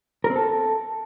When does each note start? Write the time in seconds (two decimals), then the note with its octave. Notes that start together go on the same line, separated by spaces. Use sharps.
0.24 A#4
0.30 C4
0.36 A4